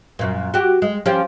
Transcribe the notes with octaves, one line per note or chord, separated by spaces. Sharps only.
F#2 A#2
F#4 G4
G#3
F3 C#4 G4